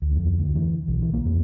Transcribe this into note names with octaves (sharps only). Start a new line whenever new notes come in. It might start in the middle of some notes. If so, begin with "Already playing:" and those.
D2
F2
D2
E3
B1
E3
A#3
F2